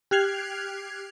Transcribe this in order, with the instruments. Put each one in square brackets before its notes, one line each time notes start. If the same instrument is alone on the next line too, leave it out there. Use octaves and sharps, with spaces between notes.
[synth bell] G4 F6 F#6 G#6 C7 F7